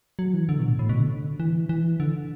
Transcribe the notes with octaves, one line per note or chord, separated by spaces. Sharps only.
F#3
E3
D3
B2
A2
A2
B2
D3
E3
E3
D3